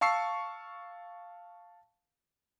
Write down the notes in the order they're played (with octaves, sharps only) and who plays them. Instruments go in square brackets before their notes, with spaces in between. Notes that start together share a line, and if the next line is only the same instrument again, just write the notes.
[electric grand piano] F5 A5 C#6 E6 C7